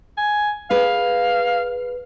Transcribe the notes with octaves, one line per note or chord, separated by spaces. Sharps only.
G#5
G#4 B4 F5